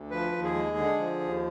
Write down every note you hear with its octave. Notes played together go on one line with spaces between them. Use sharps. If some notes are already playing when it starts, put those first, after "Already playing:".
Already playing: D2
F3 B4
D#2
G#4
G#3
D3
F3
D#2